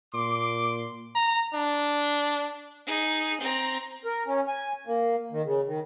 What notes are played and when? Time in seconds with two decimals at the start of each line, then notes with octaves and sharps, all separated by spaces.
0.14 A#2 C6 D6
1.15 A#5
1.54 D4
2.86 D#4 G#4
3.41 C4 A#5
4.05 A#4
4.27 C#4
4.48 G#5
4.87 A#3
5.32 D#3
5.45 C#3
5.67 D#3